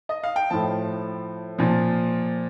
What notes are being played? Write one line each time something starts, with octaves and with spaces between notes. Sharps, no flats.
D#5
F5
G5
A2 F3 A5
A#2 F3